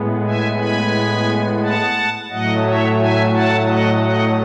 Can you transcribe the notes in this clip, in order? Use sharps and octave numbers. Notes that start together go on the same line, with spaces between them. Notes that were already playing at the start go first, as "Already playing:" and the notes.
Already playing: A2 G#3 B3
E5 G#5
G#5 B5
F#5 A5
A2 F#3 A3 D#5 F#5
C#5 E5
E5 G#5
F#5 A5
D#5 F#5
D#5 F#5